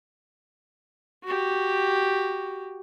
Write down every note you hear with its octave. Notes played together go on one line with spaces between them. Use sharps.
F#4 G4